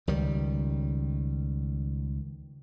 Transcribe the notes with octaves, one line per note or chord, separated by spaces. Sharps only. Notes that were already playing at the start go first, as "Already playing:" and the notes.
C#2 D#3 G3